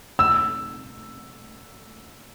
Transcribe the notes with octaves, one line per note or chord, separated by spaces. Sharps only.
E6